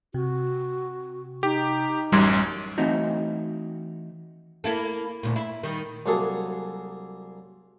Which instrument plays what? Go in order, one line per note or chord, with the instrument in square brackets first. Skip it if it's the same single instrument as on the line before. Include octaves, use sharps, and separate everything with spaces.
[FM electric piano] C3 [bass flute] F#4
[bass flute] D#4 [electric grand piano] G4
[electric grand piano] A1 F#2 [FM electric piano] G3 C6 G#6
[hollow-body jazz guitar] E3 A3 C4 D#4 F#4
[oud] A#3 E4 A4
D2 A#2
E4
D#3 G3
[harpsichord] C2 F#3 A#3 G#4 A4 D#6